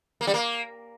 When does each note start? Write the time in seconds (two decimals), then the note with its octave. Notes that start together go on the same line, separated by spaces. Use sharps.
0.21 A#3
0.27 G3
0.34 A#3